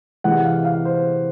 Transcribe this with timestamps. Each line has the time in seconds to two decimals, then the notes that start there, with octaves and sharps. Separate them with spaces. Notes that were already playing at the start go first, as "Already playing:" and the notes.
0.24 C3 E3 G#3 F#5
0.45 F5
0.65 F5
0.85 C5